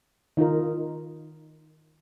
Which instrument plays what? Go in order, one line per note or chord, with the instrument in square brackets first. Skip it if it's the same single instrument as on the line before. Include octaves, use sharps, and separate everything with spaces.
[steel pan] D#3 D#4 F4 A#4